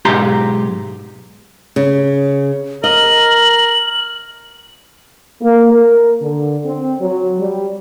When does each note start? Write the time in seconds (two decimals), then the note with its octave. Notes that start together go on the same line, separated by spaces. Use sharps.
0.05 B1 G#2 G4 A#5 C6
1.76 C#3
2.84 A#4 D#5 F#7
5.42 A#3
5.72 A#4
6.21 D3
6.65 C4
7.01 F#3
7.39 G3